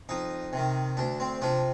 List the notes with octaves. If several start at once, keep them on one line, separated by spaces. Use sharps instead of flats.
F2 D#4
C3 D#3
D2 D4
C4
C3 F3 D4